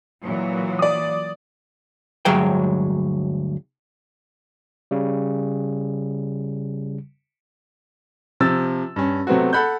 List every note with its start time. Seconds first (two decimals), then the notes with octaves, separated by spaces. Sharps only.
0.23 A#2 E3 F#3
0.79 D5 D#6
2.25 D2 G2 F#3 G#3 C#5 G5
4.91 C#3 G3
8.40 C3 F3 E6 A6
8.96 G2 C#4
9.27 C3 F#3 A3 B3 C4 F#4
9.53 A4 F#5 B5 F#6 G6